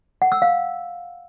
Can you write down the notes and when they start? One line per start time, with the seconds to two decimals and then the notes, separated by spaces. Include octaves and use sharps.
0.22 F#5
0.32 E6
0.42 F5